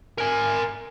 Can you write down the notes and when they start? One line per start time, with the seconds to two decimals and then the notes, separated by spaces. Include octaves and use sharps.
0.18 A#4 G#5